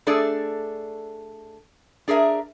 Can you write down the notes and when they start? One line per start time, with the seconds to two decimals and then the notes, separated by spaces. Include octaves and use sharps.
0.07 A3 D4 G#4 A4 D5
2.08 D4 G#4 A#4 E5